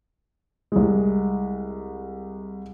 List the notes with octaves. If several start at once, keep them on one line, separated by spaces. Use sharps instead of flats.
C2 G#3